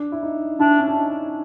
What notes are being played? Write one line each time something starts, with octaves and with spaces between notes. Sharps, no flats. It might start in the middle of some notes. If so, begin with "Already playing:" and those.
Already playing: D4
E4
D#4
D4 E4
C#4
D4
D#4